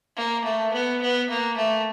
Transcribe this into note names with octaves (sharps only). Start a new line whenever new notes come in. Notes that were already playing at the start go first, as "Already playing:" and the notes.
A#3
A3
B3
B3
A#3
A3